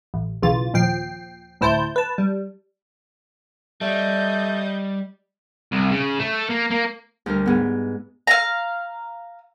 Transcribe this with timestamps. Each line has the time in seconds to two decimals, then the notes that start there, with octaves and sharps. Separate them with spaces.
0.14 A1
0.42 B1 C#3 E3 F4 A6
0.74 D#2 A#2 F3 G5 C7
1.61 D2 A2 E4 C5 A5 G6
1.96 B4 A5
2.18 G3
3.81 G3 A3 D5 D#5 G6
5.72 C2
5.91 C#3
6.19 A3
6.50 A#3
6.70 A#3
7.26 D2 D3 G3 A#4
7.46 G#2 B3
8.27 F5 A#5